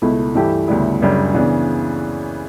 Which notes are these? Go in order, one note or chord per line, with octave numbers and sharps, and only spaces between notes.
C#2 B2 A3 E4
G2 E3 A3 E4 G4
D2 C#3 G3 B3 E4
F#1 F#2 C#3 G3 D4
C#3 E3 B3 D4